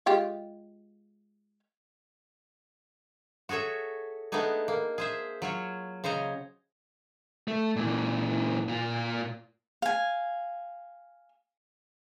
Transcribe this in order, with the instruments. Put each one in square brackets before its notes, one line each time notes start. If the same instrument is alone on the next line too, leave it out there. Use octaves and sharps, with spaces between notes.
[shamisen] G#3 F4 G4
[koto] F#4 G#4 A4 C#5 E5
A3 B3 D4 D#4 G#4
A#3
G#4 C5 E5
F#3 F4 C#5
C#3 C5 C#5 D#5 A#5
[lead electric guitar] A3
A#2 E3
A#2 F4
[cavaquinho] F5 G#5